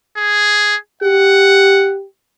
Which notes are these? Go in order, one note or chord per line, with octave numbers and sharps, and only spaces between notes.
G#4
G4 F#5